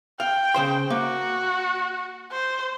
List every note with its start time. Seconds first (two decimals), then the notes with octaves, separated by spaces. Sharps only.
0.20 F5 G5
0.54 C#3 C5 C6
0.90 A#3 F#4
2.32 C5